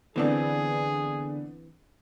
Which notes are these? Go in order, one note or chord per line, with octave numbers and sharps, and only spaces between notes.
D3 E3 A3 B3 C4 D4 G#4